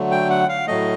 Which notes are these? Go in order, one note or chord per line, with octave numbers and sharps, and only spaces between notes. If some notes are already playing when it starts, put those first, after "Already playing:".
Already playing: D3 F#3 A3
G5
F#5
F5
A2 F#3 A3 D#5